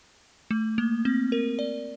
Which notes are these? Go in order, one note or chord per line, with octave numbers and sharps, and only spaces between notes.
A3
A#3
C4
A#4
D5